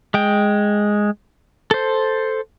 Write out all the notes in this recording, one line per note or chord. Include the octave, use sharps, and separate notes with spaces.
G#3 G5
A4 C5